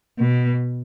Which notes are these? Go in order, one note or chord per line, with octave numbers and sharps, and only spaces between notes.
B2